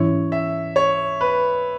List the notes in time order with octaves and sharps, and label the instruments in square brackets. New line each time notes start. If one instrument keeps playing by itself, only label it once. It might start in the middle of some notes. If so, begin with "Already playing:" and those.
Already playing: [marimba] G#2 E3 C#4 E4 [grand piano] C#5
[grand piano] E5
C#5
B4